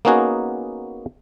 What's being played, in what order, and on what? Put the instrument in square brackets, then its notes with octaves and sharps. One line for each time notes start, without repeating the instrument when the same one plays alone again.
[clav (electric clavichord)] A#3 B3 C#4 D#4 F#4 G#4